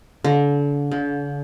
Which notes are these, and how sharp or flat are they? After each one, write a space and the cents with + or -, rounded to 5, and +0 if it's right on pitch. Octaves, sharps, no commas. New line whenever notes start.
D3 -35
D3 -45